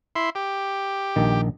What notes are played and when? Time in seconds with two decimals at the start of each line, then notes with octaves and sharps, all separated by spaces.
0.16 E4 C6
0.35 G4
1.16 A#1 D#3